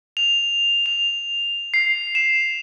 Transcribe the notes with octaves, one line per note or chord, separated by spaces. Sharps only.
F7
F7
C7
E7